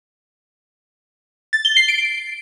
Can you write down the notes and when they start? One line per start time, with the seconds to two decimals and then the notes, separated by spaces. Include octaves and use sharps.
1.53 A6
1.65 G7
1.77 C7
1.88 D7